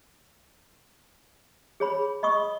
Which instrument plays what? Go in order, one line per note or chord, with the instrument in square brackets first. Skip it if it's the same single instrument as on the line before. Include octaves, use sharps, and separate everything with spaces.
[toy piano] G#4 C#5 B5
D#5 B5 C#6 D#6